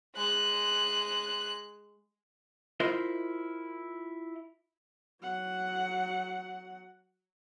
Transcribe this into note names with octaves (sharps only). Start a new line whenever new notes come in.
G#3 F#6
E4 F4 A#4 C5 D#5 E5
F#3 F#5